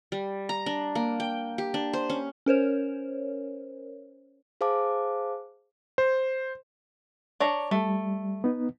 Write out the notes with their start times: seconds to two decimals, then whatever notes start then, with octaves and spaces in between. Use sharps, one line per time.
0.12 G3
0.49 A#5
0.66 D4
0.95 A#3
1.20 G5
1.58 G4
1.74 D4
1.93 C5
2.10 C#4
2.46 C#4 A#4 C5 C#5
4.61 G#4 C5 F5 A5 D6
5.98 C5
7.40 D4 C#5 A#5
7.71 G3 A3
8.44 B3 D#4